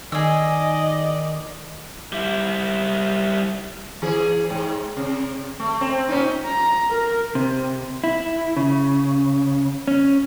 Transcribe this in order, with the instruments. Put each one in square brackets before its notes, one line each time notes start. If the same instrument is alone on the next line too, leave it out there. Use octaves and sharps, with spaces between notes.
[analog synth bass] D#3 [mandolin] G#4 E6 [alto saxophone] D5 [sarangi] D#5
[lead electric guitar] G3 E4
[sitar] E3 G#4
G#2
C3
A3
C4
A#2 C#4 D#4
[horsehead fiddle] A#5
A#4
[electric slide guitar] C3
E4
C#3
C#4